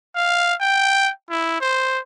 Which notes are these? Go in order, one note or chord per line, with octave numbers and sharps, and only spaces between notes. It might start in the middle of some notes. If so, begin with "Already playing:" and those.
F5
G5
E4
C5